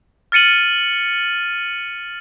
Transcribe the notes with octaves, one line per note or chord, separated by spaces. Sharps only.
F6 A6 C#7 D#7 F#7